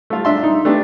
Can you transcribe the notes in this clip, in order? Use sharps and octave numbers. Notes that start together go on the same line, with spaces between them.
A3 F4
D4 E5 C6
D#4
A3 B3 D4 G4